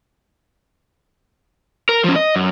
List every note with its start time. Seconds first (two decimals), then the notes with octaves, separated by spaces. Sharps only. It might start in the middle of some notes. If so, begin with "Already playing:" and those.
1.89 A#4
2.04 F3 C#4
2.16 D#5
2.36 F#2